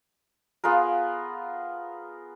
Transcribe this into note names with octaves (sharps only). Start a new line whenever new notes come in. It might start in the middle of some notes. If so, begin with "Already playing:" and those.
B3 F4 G#4 A#4